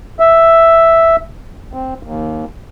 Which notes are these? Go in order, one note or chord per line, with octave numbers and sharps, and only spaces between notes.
E5
C4
D#2